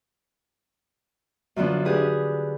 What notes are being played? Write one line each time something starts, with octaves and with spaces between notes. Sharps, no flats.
F#2 D3 F3 B3 D4
D4 G4 G#4 B4